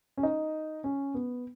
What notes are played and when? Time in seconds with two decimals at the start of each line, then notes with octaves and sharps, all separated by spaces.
0.17 C#4
0.23 D#4
0.84 C#4
1.14 B3